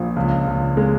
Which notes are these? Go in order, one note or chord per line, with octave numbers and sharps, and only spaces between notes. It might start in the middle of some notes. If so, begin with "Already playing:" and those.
Already playing: A#1 A#2
C#2
C#2
G#3